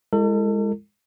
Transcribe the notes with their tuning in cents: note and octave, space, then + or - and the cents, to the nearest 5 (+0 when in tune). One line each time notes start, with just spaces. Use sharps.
G#3 -15 E4 +30 A4 +40